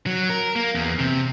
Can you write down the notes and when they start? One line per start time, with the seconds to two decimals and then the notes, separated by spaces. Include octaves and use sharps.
0.06 F#3
0.30 A#4
0.56 A#3
0.75 E2
0.99 C3